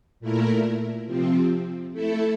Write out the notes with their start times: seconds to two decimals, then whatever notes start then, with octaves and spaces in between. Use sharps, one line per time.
0.20 A#2 A3 E4 A#4
1.06 C3 F3 C4
1.92 A3 E4 A4